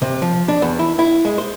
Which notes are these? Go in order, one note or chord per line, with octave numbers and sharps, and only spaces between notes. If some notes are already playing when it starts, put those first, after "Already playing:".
C3
F3
D4
E2
E4
E4
G#3
C5